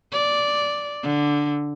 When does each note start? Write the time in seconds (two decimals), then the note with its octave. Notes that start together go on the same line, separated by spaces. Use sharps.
0.12 D5
1.03 D3